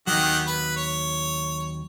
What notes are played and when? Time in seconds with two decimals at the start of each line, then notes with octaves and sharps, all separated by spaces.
0.07 D#2 D#3 F#3 G4 F#5
0.47 B4
0.77 C#5